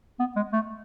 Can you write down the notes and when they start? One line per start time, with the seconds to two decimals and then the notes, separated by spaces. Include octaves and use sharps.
0.20 B3
0.36 G#3
0.53 A3